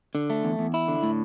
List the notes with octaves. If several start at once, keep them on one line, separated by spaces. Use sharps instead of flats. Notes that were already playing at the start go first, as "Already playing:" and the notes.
D3
A3
E2
E2
E4
D3
A2